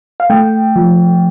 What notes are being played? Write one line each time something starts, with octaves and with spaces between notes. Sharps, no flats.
F5
A3 G5
F3